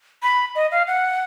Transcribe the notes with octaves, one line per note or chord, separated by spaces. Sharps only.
B5
D#5
F5
F#5